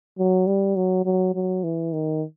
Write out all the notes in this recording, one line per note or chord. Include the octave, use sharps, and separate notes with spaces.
F#3
G3
F#3
F#3
F#3
E3
D#3